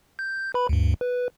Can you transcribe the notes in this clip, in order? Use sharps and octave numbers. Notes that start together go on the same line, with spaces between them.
G6
B4 B5
D2 G2
B4